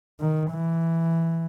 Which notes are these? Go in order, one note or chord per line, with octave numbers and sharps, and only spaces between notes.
D#3
E3